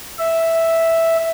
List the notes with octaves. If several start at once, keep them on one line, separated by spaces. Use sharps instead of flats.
E5